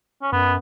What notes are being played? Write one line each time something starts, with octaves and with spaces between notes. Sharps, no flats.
C#4
F#2 B3